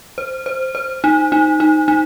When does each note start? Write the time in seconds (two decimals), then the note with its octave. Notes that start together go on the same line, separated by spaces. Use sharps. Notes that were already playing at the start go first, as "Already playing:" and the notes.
0.18 C5
0.46 C5
0.75 C5
1.04 D#4
1.32 D#4
1.60 D#4
1.88 D#4